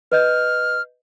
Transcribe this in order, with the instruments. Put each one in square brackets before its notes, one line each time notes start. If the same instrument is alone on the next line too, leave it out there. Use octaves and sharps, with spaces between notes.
[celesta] B4 D#5 G6 [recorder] F6